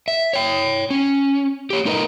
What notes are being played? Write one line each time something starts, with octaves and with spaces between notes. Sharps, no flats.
E5
C#5 G5
C#4
G4 C#5
A3 D#4 A#4 B4 D#5